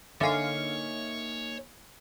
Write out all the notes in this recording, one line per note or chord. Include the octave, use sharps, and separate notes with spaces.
D3 A#3 D#4 C#5 E5 F5 G#5